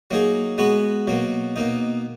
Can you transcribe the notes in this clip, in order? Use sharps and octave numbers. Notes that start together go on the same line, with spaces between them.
F#3 A#3 D#4 G#4
G#3 B3 F#4 B4
B2 F#3 A#3
B2 A#3 D#4